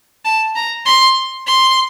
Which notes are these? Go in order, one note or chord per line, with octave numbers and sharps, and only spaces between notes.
A5
A#5
C6
C6